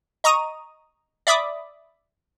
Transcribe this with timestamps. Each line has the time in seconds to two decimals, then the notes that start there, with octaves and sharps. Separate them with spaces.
0.24 D#5 A#5 C#6 D#6 D#7
1.27 D5 E5 B5 D6 D#6